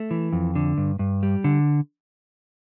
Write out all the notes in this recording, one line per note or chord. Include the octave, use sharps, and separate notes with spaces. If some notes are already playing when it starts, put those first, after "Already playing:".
Already playing: A3
E3
F2
D3
G2
G2
G3
D3